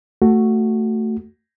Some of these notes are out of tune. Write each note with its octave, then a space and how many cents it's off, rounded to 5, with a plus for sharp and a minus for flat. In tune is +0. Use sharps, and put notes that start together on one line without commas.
A3 +10 F#4 +0